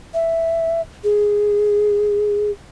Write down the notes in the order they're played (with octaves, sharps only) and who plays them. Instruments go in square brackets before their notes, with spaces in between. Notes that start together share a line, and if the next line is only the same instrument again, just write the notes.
[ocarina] E5
G#4